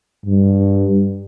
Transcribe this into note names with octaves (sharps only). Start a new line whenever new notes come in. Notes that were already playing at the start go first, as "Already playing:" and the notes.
G2